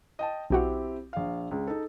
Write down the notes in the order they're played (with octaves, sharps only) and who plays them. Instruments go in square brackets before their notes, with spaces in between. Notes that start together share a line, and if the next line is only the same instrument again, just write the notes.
[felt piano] D#5 G5 A5
[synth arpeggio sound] B1 F#4 F#5 [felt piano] C4 E4 G4
[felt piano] A#1 F5
C#2
D#4 A4